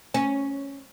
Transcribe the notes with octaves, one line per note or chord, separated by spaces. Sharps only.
C#4